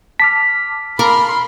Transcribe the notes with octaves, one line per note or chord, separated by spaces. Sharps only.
A5 D6 F6 B6
A#4 F5 A5 B5 C6 D6